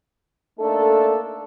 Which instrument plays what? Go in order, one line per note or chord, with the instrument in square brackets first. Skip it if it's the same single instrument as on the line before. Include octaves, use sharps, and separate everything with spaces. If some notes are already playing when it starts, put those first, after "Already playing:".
[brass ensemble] A3 A#3 D4 D#4 A4